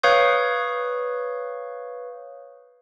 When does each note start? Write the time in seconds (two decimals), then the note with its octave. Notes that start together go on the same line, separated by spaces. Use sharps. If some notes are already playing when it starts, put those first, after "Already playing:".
0.03 B4 C#5 F5 C#6 D#6 G6